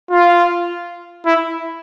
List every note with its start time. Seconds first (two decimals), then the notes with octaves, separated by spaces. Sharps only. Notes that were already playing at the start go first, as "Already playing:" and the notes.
0.11 F4
1.26 E4